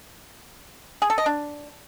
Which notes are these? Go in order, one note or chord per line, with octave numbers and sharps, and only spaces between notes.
G#4
A4
D#5
D4